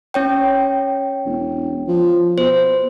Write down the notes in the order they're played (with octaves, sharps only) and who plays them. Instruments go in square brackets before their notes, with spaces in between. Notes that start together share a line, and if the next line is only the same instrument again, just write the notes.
[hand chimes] C#4 C#5 G5
[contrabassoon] E1
F3
[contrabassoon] B2 [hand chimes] C5